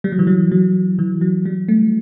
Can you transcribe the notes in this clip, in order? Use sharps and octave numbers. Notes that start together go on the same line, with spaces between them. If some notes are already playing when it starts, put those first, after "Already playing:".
G3
F#3
E3
F#3
F#3
E3
F#3
G3
A3